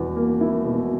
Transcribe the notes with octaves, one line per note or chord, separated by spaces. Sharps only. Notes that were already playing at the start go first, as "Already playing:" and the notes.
Already playing: E2 B2
A#3
E4
B2